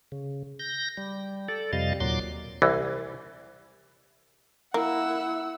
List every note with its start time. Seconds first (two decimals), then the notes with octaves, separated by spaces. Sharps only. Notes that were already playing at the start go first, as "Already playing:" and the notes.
0.12 C#3
0.59 G6 A#6
0.97 G3
1.48 A4 D5
1.73 F2 C3 G3 D#5 F5 A6
2.00 D#2 A#2 F#3 C6 D6
2.62 C2 E3
4.74 A#3 E4 F#5 E6